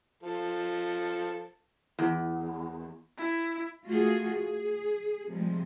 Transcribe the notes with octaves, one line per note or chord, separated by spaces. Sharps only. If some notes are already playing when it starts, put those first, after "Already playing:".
F3 A4
E2
E4
A3 F4 F#4 G#4
G#4
C3 F3 G3 G#3